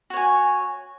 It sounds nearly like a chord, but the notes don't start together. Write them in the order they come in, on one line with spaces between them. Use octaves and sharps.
F#4 C#5 G#5